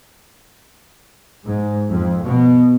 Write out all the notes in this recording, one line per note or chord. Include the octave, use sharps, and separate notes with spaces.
G#2
F2
B2